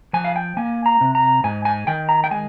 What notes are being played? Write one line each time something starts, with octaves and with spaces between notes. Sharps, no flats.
F3 G#5
F5
G5
A#3 G#5
A#5
C3
A#5
G#2 G#5
G#5
D#3 G5
A#5
G5
G#3 G#5